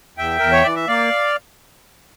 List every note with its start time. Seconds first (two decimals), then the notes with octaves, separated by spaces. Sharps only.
0.17 E2 E5 G5
0.39 E2 A#4
0.52 C#5
0.64 E3 D5
0.76 E5
0.87 A#3 D5 F5